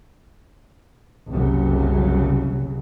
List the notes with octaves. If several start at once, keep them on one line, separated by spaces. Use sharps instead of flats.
F#1 C2 C#3 F#3